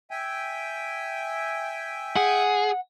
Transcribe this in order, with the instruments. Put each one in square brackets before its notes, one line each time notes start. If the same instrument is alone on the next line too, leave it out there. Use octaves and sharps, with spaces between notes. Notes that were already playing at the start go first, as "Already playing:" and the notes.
[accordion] E5 G5 G#5
[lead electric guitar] G#4 [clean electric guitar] F#5